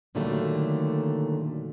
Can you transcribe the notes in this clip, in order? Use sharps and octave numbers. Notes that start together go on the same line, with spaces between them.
A#2 D3 D#3 F#3 G3 A3